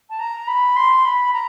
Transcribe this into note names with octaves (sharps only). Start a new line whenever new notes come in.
A5
A#5
B5
C6
B5
A#5